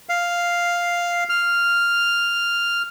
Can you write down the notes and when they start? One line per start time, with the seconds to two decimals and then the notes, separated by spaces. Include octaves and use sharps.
0.09 F5
1.29 F6